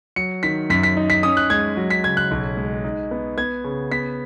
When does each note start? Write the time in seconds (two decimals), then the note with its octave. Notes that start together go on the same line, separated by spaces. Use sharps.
0.16 F#3 C#7
0.43 D#3 B6
0.70 F#2 B6
0.83 B6
0.97 D#4
1.10 B6
1.23 C#4 D#6
1.37 F#6
1.50 G#3 G#6
1.77 F#3
1.90 B6
2.04 C#3 G#6
2.17 F#6
2.31 B1
2.57 G#3
2.84 D#4
3.11 B3
3.38 B3 G#6
3.64 C#3
3.91 B3 B6